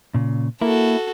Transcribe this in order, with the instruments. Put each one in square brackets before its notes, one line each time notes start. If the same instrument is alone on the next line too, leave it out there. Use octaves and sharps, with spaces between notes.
[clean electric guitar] A#2 C#3
[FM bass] A#3 [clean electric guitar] E4 [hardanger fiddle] F#4 A4